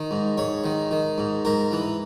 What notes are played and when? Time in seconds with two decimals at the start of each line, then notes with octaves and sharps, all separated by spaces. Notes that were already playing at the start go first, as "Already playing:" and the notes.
Already playing: D#3
0.11 G#2
0.37 G#2 C#5
0.64 D#3
0.91 D#3
1.18 G#2
1.45 G#2 A#4
1.72 E3